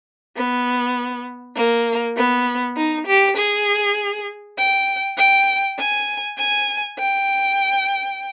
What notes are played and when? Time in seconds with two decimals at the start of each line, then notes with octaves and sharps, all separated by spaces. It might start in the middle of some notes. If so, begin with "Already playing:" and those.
0.36 B3
1.56 A#3
2.16 B3
2.77 D#4
3.07 G4
3.37 G#4
4.58 G5
5.18 G5
5.79 G#5
6.38 G#5
6.99 G5